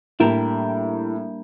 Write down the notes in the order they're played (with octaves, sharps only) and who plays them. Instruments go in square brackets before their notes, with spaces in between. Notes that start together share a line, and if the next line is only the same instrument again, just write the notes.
[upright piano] A2 [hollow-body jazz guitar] G3 A#3 D4 G4 A#4